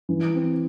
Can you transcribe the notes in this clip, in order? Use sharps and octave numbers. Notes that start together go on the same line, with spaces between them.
E3
C4